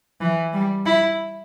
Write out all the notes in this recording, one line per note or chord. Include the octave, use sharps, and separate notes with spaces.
E3
G3
E4